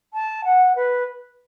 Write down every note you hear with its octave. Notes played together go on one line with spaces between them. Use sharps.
A5
F#5
B4